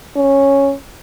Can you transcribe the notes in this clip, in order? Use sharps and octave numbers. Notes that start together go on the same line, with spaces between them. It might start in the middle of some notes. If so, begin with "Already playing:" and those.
C#4